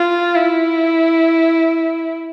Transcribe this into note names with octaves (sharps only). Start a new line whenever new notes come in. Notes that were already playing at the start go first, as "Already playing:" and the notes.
Already playing: F4
E4